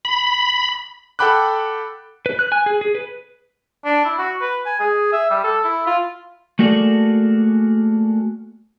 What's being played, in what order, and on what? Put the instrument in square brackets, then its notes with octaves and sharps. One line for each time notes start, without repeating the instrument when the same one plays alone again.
[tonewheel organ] B5
[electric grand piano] A4 F#5 G5 B5 D6 F#6
[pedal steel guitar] B4
F#6
G#5
G#4
G#4
B4
[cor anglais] D4
E4
F#4
B4
G#5
G#4
E5
G3
A4
E4
F4
[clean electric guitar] A3 A#3 F#4 G#4 A4 D5